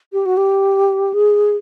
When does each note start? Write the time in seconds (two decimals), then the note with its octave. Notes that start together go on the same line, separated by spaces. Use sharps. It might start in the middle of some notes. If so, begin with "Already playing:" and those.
0.13 G4
0.26 F#4
0.37 G4
1.14 G#4